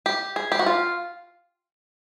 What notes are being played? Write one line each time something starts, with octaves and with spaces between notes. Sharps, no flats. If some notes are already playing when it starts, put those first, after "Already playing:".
G4
G#4
G4
F#4
F4